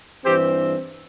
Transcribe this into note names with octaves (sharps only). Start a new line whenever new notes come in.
G2 E3 C4 G4 C5